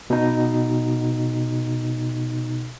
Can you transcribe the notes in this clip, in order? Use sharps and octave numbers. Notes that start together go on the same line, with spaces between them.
B2 D#4